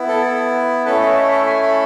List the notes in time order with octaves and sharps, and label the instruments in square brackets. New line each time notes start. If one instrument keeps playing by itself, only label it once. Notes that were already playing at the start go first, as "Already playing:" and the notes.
Already playing: [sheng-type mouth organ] B3 E4
A4
A3 C#4 E4 A4 B4
D#5
E5
E5
G#5
B5